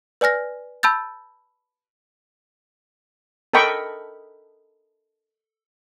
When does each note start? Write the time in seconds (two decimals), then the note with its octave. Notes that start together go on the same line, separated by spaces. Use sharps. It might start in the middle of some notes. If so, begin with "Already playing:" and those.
0.21 B4 D5 G#5 F6 A#6
0.83 A5 B5 E6 G6 A6
3.53 A4 A#4 D#5 G5 B5 C#6